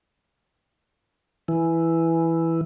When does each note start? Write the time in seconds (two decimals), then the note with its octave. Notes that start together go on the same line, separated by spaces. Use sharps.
1.48 E3